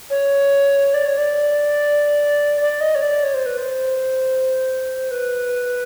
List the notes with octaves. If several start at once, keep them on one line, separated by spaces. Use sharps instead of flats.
C#5
D5
C#5
D5
D5
D#5
C#5
D5
C#5
C5
B4
C5
B4